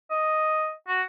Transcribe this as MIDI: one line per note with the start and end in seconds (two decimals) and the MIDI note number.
0.11 0.71 75
0.88 1.02 66